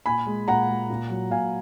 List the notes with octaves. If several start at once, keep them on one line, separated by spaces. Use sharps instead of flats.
A#2 G#5 B5
G#3
A#2 F#5 A#5
G#3
A#2
F#3
A#2 F5 G#5